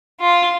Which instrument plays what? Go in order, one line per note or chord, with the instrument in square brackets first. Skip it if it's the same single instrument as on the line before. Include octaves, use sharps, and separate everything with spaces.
[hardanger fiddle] F4